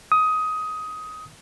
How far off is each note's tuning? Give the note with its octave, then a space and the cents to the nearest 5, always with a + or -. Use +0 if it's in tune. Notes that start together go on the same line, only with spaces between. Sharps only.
D#6 +15